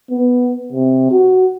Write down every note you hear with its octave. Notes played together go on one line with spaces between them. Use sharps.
B3
C3
F#4